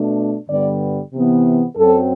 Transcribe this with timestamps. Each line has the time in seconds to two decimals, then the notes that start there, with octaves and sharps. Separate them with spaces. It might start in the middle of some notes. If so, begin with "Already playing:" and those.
Already playing: B2 A3 D4
0.49 G2 D3 G3 B3 D5
1.13 C3 E3 B3
1.77 F#2 F#3 C4 A4